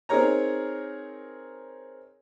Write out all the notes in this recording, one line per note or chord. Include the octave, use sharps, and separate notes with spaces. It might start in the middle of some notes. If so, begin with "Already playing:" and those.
C4 D#4 G#4 A#4 C#5 A#5